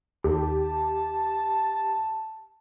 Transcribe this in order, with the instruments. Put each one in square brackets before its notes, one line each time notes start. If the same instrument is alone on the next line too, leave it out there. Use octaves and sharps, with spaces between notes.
[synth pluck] D#2 [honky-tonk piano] G4 [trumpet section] A5